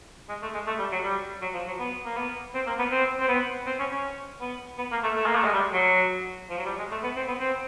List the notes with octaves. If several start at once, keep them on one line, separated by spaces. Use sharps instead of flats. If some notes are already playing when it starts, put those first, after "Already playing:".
G#3
A3
G#3
A3
G3
F#3
G3
F#3
F3
F#3
B3
A#3
B3
C4
A#3
B3
C4
C4
B3
C4
C#4
C#4
B3
B3
A#3
A3
A3
A#3
A3
G#3
G3
F#3
F3
F#3
G3
G#3
A3
B3
C4
B3
C4